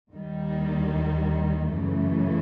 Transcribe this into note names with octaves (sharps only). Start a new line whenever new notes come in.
D#2 D#3 G3
F#2 C#3 E3 A3